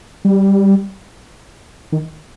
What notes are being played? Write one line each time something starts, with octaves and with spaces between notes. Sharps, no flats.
G3
D#3